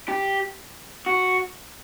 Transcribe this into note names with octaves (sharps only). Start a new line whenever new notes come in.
G4
F#4